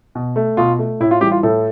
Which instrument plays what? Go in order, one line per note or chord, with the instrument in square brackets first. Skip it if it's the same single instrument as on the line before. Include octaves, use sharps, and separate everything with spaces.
[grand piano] B2
A3
B2 F4
A3
A2 E4
F4
E3 G3 G4
F4
A2 A4